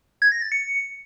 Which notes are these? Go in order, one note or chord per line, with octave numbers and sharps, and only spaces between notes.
G#6
A#6
A6
C#7